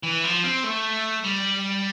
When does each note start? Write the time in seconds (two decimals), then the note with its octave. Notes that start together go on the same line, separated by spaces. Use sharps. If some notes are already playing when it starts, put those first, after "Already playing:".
0.03 E3
0.24 F3
0.44 C4
0.64 A3
1.24 G3